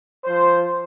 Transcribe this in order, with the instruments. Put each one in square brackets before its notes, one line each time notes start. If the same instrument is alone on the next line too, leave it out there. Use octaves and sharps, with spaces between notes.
[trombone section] F3 C5